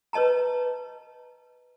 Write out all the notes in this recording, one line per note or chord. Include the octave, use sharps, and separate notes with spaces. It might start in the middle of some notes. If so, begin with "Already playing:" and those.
B4 C#5 D#5 A5 A#5